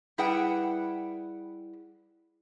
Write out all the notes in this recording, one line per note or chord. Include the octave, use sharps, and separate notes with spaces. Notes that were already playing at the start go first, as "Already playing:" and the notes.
G3 E4 G#4 B4 F#5 G5